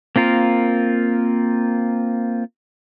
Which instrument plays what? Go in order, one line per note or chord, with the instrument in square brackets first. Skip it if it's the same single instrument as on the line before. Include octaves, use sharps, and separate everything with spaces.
[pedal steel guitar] A#3 C4 F4 A#4